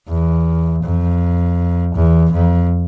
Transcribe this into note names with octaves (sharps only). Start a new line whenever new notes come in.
E2
F2
E2
F2